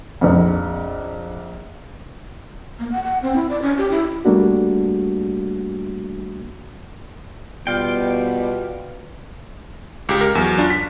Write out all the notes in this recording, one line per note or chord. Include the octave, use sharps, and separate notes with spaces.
A#1 F2
A#3
F#5
F#5
C4
E4
D5
C#4
G4
E4
G3 A3 A#3 D4 F#4
B2 G3 B3 F4 G5
C#2 G4
A#4
E2 F#3
D4 F4
B6